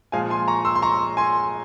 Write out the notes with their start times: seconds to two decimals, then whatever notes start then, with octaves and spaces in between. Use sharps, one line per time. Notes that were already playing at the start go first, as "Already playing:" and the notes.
0.12 A#2 F3 G#3 F5 G#5
0.30 G#5 C6
0.48 A#5 C#6
0.65 C6 E6
0.75 C6
0.82 A#5 C#6
1.17 G#5 C6